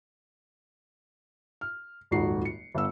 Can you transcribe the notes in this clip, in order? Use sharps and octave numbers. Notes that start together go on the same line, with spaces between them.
F6
D#1 G#1 F2 D#4 F#4 C7
C#7
G1 B3 E6